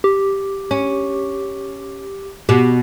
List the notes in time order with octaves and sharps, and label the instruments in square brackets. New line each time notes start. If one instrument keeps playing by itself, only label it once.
[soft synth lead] G4
[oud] C#4
[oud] B2 [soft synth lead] G4